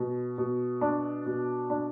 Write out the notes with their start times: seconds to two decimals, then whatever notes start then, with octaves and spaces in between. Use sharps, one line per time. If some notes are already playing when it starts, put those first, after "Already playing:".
Already playing: B2
0.38 B2
0.81 D4
1.26 B2
1.70 D4